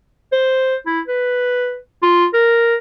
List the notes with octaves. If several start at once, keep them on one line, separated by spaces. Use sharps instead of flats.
C5
E4
B4
F4
A#4